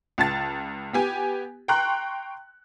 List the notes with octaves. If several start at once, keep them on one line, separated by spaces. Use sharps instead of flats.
C#2 A5 A6
B3 G4 G#5
G5 A#5 C6 C#6 F#6